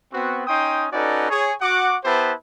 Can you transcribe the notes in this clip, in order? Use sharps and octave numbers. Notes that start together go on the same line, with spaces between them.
B3 C4 F#4
C#4 D#4 G5 C6 D#6
C#4 D#4 F#4 A4 B4 D5
G#4 C#5
F#4 F#5 D6
B3 E4 G4 B4 C5 A5